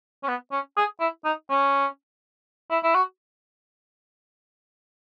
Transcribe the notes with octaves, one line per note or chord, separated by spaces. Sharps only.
C#4
B3
C#4
G#4
E4
D#4
C#4
E4
E4
F#4